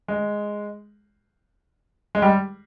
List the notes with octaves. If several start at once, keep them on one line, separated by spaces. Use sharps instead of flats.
G#3
G#3
G3